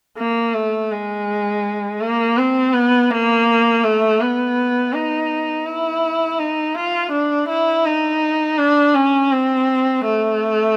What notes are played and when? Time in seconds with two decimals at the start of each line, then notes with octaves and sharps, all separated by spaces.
0.18 A#3
0.54 A3
0.92 G#3
2.01 A#3
2.38 C4
2.73 B3
3.11 A#3
3.84 A3
4.21 B3
4.93 D#4
5.66 E4
6.39 D#4
6.75 F4
7.12 D4
7.49 E4
7.86 D#4
8.58 D4
8.94 C#4
9.32 C4
10.05 A3